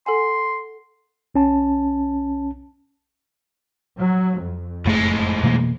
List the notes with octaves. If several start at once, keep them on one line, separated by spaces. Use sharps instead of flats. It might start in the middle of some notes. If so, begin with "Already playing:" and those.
A4 F#5 G#5 C6
B1 C#4 A5
F#3
F2
F#1 A2 G#3 A3
B2 E3 A#3